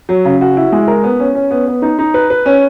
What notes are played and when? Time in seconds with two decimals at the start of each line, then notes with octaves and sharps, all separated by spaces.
0.09 F#3
0.25 C#3
0.41 F#4
0.57 E4
0.72 G#3
0.88 A#4
1.04 B3
1.20 C#4
1.35 C#4
1.51 B3
1.67 B3
1.82 D#4
1.99 D#4
2.14 B4
2.30 B4
2.46 C#4